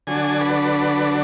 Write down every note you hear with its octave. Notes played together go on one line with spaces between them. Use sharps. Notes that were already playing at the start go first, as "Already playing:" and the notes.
D3 F#3 D4 G#5
B4